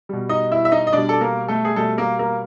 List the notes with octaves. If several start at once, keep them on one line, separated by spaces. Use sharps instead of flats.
B2 G3
D#4 D#5
E4 E5
E5
D#4 D#5
D#5
B2 G3 D4 D5
A4
A#3 A#4
A3 A4
G#4
B2 G3 A3 A4
A#3 A#4
A#3 A#4